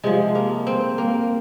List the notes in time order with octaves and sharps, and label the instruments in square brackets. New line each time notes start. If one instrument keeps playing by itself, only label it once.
[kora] C3 F3 G#3
A#3
C4
A#3